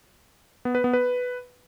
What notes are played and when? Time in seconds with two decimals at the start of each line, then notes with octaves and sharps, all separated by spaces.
0.65 B3
0.75 B4
0.84 B3
0.93 B4